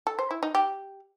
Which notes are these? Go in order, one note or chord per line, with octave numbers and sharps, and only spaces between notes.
A4
C5
E4
D#4
G4